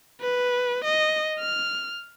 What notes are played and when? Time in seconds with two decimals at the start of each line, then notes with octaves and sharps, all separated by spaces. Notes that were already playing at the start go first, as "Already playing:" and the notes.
0.21 B4
0.85 D#5
1.40 F6